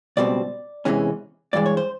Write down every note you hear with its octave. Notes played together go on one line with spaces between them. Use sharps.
C#2 B2 G3 C4 D5
E2 C3 E3 G#3 C#4
G2 E3 G#3 D5
C#5
C5